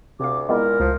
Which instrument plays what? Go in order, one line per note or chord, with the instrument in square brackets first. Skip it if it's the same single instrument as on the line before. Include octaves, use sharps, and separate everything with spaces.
[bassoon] D2 [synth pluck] C3 F5 [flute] D6
[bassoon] A#2 [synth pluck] G#3 B3 E4 [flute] A#4
[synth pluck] C#2 [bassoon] F3